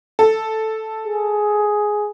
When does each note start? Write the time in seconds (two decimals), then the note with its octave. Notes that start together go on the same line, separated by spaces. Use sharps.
0.19 A4
1.07 G#4